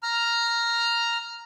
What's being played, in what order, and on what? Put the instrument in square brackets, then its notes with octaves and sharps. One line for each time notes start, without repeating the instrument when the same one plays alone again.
[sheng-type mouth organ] A#5 F6